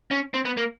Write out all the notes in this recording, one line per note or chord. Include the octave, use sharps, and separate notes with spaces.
C#4
C4
B3
A#3